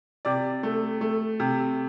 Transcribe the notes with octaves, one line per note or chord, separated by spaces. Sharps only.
C3 D5
A3
A3
C3